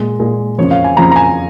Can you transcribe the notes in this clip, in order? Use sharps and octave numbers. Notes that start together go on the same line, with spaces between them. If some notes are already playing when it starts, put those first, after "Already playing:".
Already playing: A#2 G#3
A#2 G#3
F2 C#3 F3 C#5
F5
G#5
F2 C#3 F3 A#5
A#5
G#5